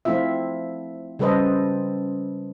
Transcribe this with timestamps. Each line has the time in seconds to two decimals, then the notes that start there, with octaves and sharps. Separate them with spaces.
0.05 F3 A3 C4 E4 F4 E5
1.19 C#3 G3 A4 B4 C5 D#5